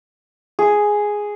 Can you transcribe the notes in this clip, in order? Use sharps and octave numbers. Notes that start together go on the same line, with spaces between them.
G#4